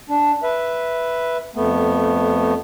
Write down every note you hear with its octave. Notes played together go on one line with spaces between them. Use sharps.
D4
B4 E5
F2 A3 B3